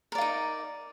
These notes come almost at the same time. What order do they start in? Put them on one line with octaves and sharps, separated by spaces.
A#4 D5 F4 D#4